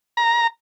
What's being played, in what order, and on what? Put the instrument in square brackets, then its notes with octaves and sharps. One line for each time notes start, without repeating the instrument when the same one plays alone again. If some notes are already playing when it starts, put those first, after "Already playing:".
[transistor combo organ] A#5